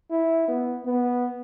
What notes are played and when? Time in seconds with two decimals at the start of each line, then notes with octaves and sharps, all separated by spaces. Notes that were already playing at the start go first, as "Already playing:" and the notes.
0.10 E4
0.48 B3
0.85 B3